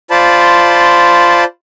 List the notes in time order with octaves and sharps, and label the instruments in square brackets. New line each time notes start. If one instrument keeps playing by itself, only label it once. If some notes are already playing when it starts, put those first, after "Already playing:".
[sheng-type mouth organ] F4 C5 D5 A5 B5